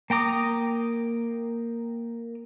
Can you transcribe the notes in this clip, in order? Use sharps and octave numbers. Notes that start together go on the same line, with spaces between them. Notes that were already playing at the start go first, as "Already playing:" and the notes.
A#3 G5 A#5 D6 D#6